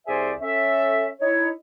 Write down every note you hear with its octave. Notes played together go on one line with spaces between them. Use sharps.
C2 G#4 C5 D5 E5 G#5
C#4 A4 E5
D#4 E4 C#5